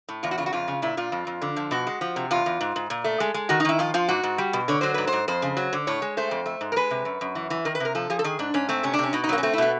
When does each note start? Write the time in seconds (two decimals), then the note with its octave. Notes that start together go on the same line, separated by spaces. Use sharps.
0.09 A2
0.23 E2 F4
0.31 F#4
0.38 C#3 F4
0.46 F#4
0.53 F2 F4
0.68 C#3
0.82 A#2 E4
0.97 A#2 F4
1.12 F2
1.27 F2
1.42 D3
1.56 F3
1.71 B2 F#4
1.87 G#3
2.01 F3
2.16 C3
2.31 E2 F4
2.46 E2
2.61 G#2
2.76 G#2
2.90 A#2
3.04 A3
3.20 G#3
3.34 G#3
3.49 D#3 F#4
3.60 D#4
3.65 D#3 E4
3.79 F3 F4
3.94 F3 F4
4.08 G#2 F#4
4.23 G#2
4.38 G3
4.53 B2
4.68 D3 C#5
4.81 F#3 C5
4.94 G#2 B4
5.07 C5
5.13 G#2
5.28 F2 C5
5.42 C#3
5.57 F#3
5.73 D3
5.87 A2 C#5
6.02 G#3
6.17 A3 C5
6.31 F2
6.46 A3
6.61 G#2
6.72 A#4
6.76 G#3 B4
6.91 C3
7.05 F#2
7.21 F#2
7.35 E3
7.50 E3
7.65 D#3 A#4
7.75 B4
7.80 C3 A#4
7.95 F3 A4
8.10 F3 G#4
8.19 A4
8.24 D#3 G#4
8.39 G#2 D4
8.54 G#2 C#4
8.69 A3 C4
8.83 C3 C#4
8.94 D4
8.99 C3 C#4
9.13 B2 D#4
9.24 D#4
9.29 F#3 A#3
9.38 C#4
9.43 A3 C4
9.53 E4
9.58 B2 B3